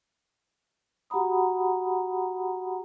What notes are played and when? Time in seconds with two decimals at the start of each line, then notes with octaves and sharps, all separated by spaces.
1.10 F#4 G4 F#5 A#5 B5 D#6